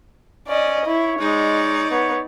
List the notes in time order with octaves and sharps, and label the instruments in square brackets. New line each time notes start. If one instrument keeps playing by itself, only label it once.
[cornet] C#4 [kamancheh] D5 D#5
[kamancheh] E4 [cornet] C#5
[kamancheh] G#3 [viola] D#4 D5
[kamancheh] B3 [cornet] C#5